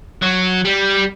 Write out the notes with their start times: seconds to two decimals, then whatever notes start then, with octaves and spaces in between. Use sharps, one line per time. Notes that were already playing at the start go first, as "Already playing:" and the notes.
0.23 F#3
0.65 G3